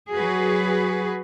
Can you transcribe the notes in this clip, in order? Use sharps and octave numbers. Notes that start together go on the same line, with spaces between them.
F#3 F#4 G#4 B4